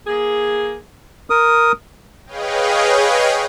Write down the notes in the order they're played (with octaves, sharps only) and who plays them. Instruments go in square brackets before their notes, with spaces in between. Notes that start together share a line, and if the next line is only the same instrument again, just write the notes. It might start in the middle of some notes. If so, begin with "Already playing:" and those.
[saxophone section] A#3 G#4
[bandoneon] A#4 D#6
[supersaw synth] G#4 B4 C#5 D#5 F5 G5